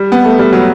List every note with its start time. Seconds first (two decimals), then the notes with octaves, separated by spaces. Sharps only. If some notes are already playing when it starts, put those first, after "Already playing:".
Already playing: G3
0.12 B3
0.25 A3
0.39 G3
0.53 F#3